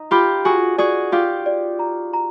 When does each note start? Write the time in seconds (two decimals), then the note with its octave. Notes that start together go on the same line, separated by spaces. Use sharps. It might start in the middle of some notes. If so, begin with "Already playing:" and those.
Already playing: D#4
0.11 F4 G4 B5
0.45 F#4 G#4 G#5
0.78 F#4 G#4 D5
1.12 F4 G4 F5
1.46 D5
1.79 A#5
2.13 A#5